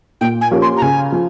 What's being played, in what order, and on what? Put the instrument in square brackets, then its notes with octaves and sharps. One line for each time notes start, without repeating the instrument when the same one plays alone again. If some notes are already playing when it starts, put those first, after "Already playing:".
[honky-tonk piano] A#2 [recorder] G5
[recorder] G#5
[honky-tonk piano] F3 A#3 C#4 G4
[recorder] C6
A#5
[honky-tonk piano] C#3 [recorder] G#5
[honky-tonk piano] F3